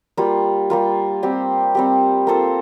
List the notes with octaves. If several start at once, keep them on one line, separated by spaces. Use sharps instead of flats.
G3 A#3 F4
G3 A#3 F4
G3 C4 G4
G3 C4 G4
A#3 F4 A4 C5